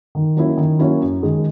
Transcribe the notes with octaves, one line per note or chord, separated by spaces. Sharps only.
D#3
F#3 A#3 C#4 E4
D#3
F#3 A#3 C#4 E4
F#2
D#3 G#3 D#4